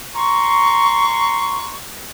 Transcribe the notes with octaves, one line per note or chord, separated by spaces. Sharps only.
A#5 C6 C#6